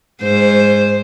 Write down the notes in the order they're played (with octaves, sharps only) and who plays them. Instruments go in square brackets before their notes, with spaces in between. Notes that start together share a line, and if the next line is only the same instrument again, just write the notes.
[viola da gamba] G#2 C5